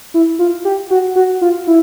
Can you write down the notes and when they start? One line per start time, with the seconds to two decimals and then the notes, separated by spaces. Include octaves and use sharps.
0.14 E4
0.39 F4
0.65 G4
0.91 F#4
1.16 F#4
1.41 F4
1.67 E4